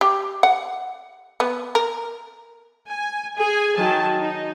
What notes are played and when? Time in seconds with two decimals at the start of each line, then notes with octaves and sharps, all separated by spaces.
0.01 G4
0.43 F#5
1.40 B3
1.75 A#4
2.87 G#5
3.36 G#4 G#5
3.76 D#3 F#3 G#5 A5
4.18 D#4